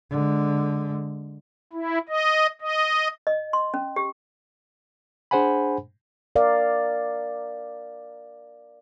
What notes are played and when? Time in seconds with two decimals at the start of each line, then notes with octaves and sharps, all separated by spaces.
0.11 D3 G#3
1.73 E4
2.09 D#5
2.61 D#5
3.27 D#5
3.53 C6
3.74 C#4
3.96 G4
5.31 D4 G#4 C5 F#5 G#5 B5
6.36 A#4 D5 F5